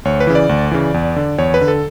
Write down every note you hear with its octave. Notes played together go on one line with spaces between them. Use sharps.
D2 C#5
B4
C#3 E3
D5
D2
C#3 E3
E2
D3
E2 C#5
B4
D3
A4